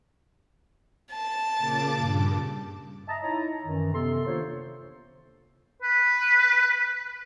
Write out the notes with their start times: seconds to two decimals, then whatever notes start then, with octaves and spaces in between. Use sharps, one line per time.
1.12 A5
1.58 A#2 C#3 D6
1.96 G2
3.08 D#5 E5 A5 A#5
3.22 D#4 E4 C#5 D#5 A#5
3.64 F#2 D#3 E3
3.93 C3 B3 A4 C6
4.26 D#3 A#3 D4 F4 C5 C#5
5.82 B4